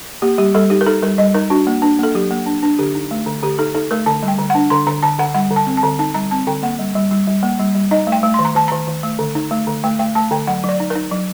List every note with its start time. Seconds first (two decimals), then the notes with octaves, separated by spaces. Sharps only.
0.22 A#3 G4
0.38 G3 G4
0.54 G3 A4
0.70 D#4 G4
0.81 A#4
0.86 D#4 A4
1.03 G3 A#4
1.18 G3 D#5
1.34 D#4 A#4
1.50 D4 F#4
1.67 A#3
1.82 D4
1.99 A#3 A4
2.15 F#3 G4
2.31 A#3
2.46 D4
2.62 D4
2.79 D3 G4
2.95 D#4
3.11 A3
3.27 D3
3.43 D3 G4
3.59 D#4 A4
3.75 D#4 A4
3.91 A3 A#4
4.06 D3 A5
4.23 G3
4.28 G5
4.38 D3
4.50 F#5
4.55 D4
4.70 D3 C6
4.87 D3 A#5
5.03 D3 A5
5.19 D3 F#5
5.34 G3 F#5
5.51 D3
5.56 A5
5.67 C4
5.77 A5
5.83 D3
5.99 D#4 A5
6.14 G3 A#5
6.31 C4 A5
6.47 D3 G5
6.63 A#3 F#5
6.79 G3
6.95 G3
7.11 G3
7.27 G3
7.43 A#3
7.59 G3
7.75 G3
7.91 D#4 D#5
8.07 A3
8.12 G5
8.23 A3
8.34 D#3 C6
8.45 A#5
8.55 D#3 A5
8.68 D#3 A#5
8.87 D#3
9.03 A3
9.19 D3
9.35 D#4
9.51 A3
9.67 D3
9.84 A3 G5
9.99 A3 G5
10.15 A3 A5
10.31 D3 G5
10.47 F#3 F#5
10.64 F#3 D5
10.80 D#4
10.90 A#4
10.95 D#4
11.11 F#3